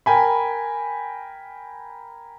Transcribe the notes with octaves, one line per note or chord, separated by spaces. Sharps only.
A#4 G5 G#5 B5